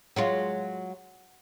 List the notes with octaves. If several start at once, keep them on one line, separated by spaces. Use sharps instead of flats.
F#3 G#3 F4